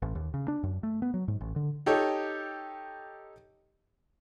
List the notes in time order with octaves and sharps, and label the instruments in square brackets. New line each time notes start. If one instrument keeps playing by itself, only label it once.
[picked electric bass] A1
D#2
C#3
D4
F#2
A3
B3
F#3
G#2
A1
D3
[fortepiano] D#4 G4 A4 C#5